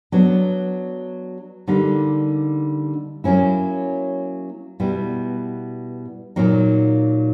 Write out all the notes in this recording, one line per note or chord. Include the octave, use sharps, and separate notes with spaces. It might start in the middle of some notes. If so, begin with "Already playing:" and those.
F#3 B3 D4
D3 G3 A#3 D#4
F#3 A#3 C#4 E4
B2 G3 B3 E4
A#2 F#3 A#3 D#4